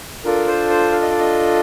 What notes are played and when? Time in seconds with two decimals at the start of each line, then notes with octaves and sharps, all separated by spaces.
0.24 D4 F4 A4 A#4
0.47 C5
0.69 C5
0.91 F5
1.01 D#5
1.11 D5
1.19 D#5